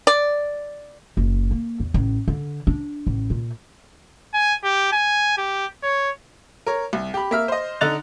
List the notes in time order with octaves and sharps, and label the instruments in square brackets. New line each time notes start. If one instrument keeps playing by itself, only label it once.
[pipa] D5
[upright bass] F#1
A#3
E2
A1
D3
D4
A1
A#2
[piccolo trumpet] G#5
G4
G#5
G4
C#5
[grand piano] A#4 C#5
C2
G4 B5
A#3 E5 F6
C5 D#5
D3 D#4 F#6 A6 F7